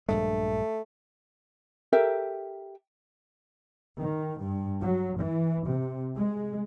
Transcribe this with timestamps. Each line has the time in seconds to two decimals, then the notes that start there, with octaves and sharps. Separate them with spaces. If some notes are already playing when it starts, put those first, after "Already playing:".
0.09 A#1 G2 G#3 A3
1.93 G4 A4 A#4 E5
3.99 D#3
4.39 G2
4.81 F#3
5.18 E3
5.66 C3
6.17 G#3